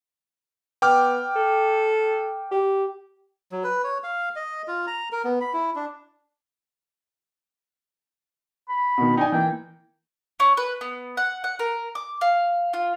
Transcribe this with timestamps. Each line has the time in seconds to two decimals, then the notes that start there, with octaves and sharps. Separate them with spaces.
0.82 B3 G5 D6 F6
1.36 A4
2.51 G4
3.52 F#3
3.64 B4
3.84 C#5
4.04 F5
4.36 D#5
4.68 F4
4.87 A#5
5.12 A#4
5.24 B3
5.41 B5
5.53 E4
5.76 D4
8.69 B5
8.98 B2 D#3
9.17 D#4 D5 G5 G#5
9.32 E3 A#3 G5
10.40 C#4
10.57 B4
10.81 B3
11.17 F#5
11.44 F#5
11.59 A#4
11.95 D6
12.21 F5
12.73 F4